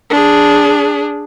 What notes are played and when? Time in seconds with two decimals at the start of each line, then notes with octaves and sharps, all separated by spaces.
0.10 D4 G#4